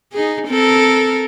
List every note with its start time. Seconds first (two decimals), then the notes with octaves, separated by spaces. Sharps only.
0.13 D#4 G#4
0.47 C4 A4 A#4